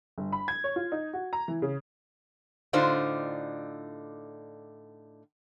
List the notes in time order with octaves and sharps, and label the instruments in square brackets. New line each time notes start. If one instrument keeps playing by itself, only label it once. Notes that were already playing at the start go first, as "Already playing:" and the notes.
[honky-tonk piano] G1
B5
G#6
C#5
F4
D#4
F#4
A#5
E3
C#3
[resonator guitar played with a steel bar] A2 D3 D4 D#4 F4 C5